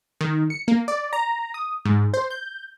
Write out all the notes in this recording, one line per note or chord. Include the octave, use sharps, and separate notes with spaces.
D#3
C#7
A#3
D5
A#5
D#6
G#2
C5
G6